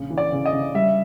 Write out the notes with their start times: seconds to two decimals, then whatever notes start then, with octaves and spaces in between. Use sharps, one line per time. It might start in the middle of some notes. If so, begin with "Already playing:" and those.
Already playing: A#1 C#3
0.10 E3
0.18 D5
0.32 C#3
0.46 D#5
0.53 C#3
0.74 G3 E5